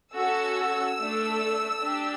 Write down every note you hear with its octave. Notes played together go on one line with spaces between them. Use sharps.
C#4 F#4 A4 E6
A3 D4 A4
D4 G4